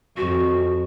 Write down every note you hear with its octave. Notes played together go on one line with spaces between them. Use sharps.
F2 F#4